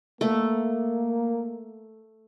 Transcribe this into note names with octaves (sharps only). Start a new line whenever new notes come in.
A3 A#3